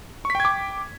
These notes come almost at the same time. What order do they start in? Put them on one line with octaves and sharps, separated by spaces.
C#6 B6 G5 G#6 D6